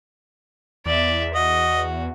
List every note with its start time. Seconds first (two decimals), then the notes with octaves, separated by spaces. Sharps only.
0.86 E2 D5 E5
1.34 F#4 D#5